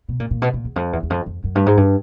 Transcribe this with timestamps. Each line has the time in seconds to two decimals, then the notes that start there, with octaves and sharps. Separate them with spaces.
0.08 B2
0.20 A#2
0.31 A#2
0.42 B2
0.54 A#2
0.64 E2
0.76 F2
0.93 E2
1.03 E2
1.10 F2
1.26 F2
1.44 F#2
1.55 G2
1.66 G#2
1.77 G2